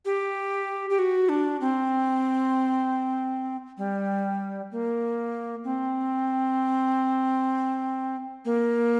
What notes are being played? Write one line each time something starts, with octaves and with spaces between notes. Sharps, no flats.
G4
G4
F#4
D4
C4
G3
A#3
C4
A#3